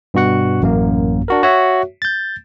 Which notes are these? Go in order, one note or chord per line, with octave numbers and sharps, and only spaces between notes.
G2 B2 F#4 F#5
A1 F#2 A#3
D4 F#4 A#4
F#4 C#5 E5
G6 A6